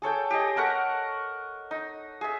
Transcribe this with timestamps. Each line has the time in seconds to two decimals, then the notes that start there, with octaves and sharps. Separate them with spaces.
0.02 G#4 A4 C#5 G5
0.31 G4 G#4 D#5
0.56 A4 A#4 F#5 C#6
1.71 D#4
2.21 G#4 E5